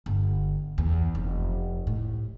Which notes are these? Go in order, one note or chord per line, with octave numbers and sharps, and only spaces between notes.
G1
E2
F1
A2